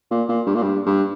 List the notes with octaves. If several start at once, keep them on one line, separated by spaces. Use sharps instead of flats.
A#2
A#2
G2
A#2
G2
G2